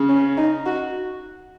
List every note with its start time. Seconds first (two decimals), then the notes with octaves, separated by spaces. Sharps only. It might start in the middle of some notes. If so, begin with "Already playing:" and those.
Already playing: C#3
0.09 C#4
0.38 D#4
0.66 F#4